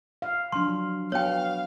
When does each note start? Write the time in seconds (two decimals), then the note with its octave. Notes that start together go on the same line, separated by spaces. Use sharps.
0.22 F5
0.52 F3 F#3 D4 C6
1.12 B3 F#4 C#5 F5 G5